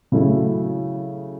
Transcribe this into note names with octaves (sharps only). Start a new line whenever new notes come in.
C#3 F#3 A3 E4